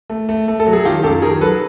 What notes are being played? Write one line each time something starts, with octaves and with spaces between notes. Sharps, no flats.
A3
A3
A3
A4
F#3
G#4
D#3 F4 G4
F#2 G4 A4
D#3 G#4 A#4
F#3 A4 B4